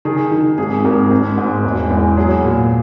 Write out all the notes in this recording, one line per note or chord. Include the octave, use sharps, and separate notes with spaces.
D#3 G#4
D#3
G#1 G#4
G#1 A#4
G#1
G#2
E1
E2
F#3 G#4
A#2